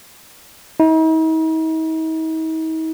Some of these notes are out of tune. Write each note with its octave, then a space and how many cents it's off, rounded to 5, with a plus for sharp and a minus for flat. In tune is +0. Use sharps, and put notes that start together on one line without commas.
D#4 +45